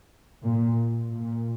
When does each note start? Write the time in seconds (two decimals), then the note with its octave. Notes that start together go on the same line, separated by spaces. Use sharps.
0.42 A#2
1.11 A#2